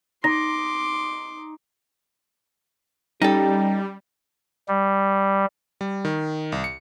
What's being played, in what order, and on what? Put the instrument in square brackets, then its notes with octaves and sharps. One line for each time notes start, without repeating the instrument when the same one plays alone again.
[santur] D#4 [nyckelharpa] C6 D6 [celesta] A#6
[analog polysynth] G3 [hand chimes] C#4 G5 A#5 [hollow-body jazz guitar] D#4 A4 [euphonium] G4
[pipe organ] G3
[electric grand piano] G3
D#3
C2
C#7